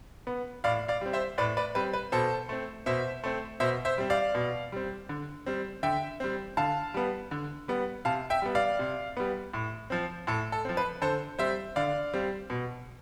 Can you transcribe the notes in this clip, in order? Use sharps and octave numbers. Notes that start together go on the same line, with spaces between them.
B3
A2 D5 F5
D5 F5
G3 C4
C5 E5
A2 B4 D5
B4 D5
G3 C4 B4
B4
B2 A4 C5
A3 C4
B2 C5 E5
A3 C4
B2 C5 E5
C5 E5
G3 C4
D5 F5
B2
G3 C4
D3
G3 C4
D3 E5 G5
G3 C4
D3 F5 A5
G3 B3
D3
G3 B3
C3 F5 A5
E5 G5
G3 B3
D5 F5
C3
G3 B3
A2
F3 C4
A2 A4
A4
F3 C4
B4
D3 A4 C5
G3 C4 C5 E5
D3 D5 F5
G3 C4
B2